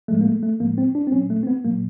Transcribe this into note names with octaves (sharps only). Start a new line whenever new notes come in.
A2 F3 G#3 A3
A#3
A3
A3
A2 F3 G#3 A#3
C4
D4
C4
A#2 F#3 C#4
A3
C4
B3
A#2 F#3 A#3